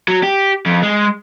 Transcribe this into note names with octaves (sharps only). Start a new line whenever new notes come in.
F#3
G4
F2
G#3